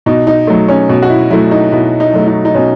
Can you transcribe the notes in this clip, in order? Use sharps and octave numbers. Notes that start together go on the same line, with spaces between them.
B2 D#4
D#4
F#3 A3
C#4
B2
F#4
E4
F#3 A3 E4
D#4
B2 E4
D#4
F#3 A3
D#4
D#4
B2 C#4